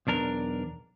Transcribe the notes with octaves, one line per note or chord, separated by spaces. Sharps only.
B1 E2 D4 A#4